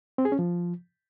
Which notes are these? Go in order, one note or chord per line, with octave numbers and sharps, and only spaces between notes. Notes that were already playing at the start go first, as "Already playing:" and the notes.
C4
G#4
C#4
F3